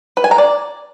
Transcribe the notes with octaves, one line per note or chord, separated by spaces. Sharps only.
B4
G#5
A#5
D5